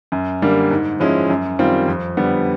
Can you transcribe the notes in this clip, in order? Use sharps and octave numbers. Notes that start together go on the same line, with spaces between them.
F#2
D3 G3 A#3
G#2
F3 G#3 C#4 E4
F#2
D#3 G3 C4 F4
F2
D3 G3 B3